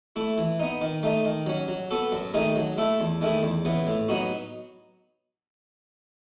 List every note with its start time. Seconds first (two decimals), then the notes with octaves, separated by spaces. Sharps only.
0.16 A3 E4
0.38 E3
0.60 B3 D#4
0.81 D#3
1.03 A3 D#4
1.25 D#3
1.46 F#3 C#4
1.68 F#3
1.91 B3 F#4 A4
2.12 F#2
2.34 D#3 A3 D#4 G#4
2.56 F#3
2.78 A3 E4 A4
3.00 E2
3.21 D#3 A3 E4 G#4
3.43 E2
3.65 C#3 E3 B3
3.87 A2
4.09 F#3 B3 D#4 F#4